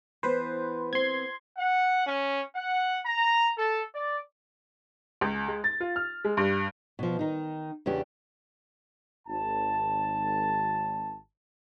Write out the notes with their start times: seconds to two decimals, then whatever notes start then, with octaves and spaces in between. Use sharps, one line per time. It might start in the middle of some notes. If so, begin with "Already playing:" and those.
0.23 E3 B3 B4 C5
0.93 B3 C4 C6 G#6
1.58 F#5
2.06 C#4
2.56 F#5
3.05 A#5
3.58 A4
3.94 D5
5.21 C#2
5.48 G#3
5.64 A6
5.80 F4
5.96 F6
6.24 G#3
6.37 G2
6.99 B2 F3
7.19 D#3 D#4
7.86 E2 C#3 D4 G4
9.27 G#1 A5